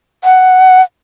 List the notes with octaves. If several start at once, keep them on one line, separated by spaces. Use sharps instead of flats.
F#5